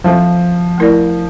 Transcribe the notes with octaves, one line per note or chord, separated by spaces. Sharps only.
F3 C4 F4 A4 C5 E5
A3 E4 A#4 D5